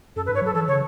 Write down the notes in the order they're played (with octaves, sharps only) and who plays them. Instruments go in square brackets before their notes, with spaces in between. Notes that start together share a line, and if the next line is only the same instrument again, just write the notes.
[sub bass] F#2 [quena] A4
[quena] B4
[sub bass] G#2
[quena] C#5
[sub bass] F#3 [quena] A4
[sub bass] E3 [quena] A4
[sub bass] C#3 [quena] C#5